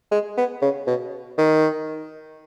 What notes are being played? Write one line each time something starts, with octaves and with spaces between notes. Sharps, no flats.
G#3
B3
C#3
B2
D#3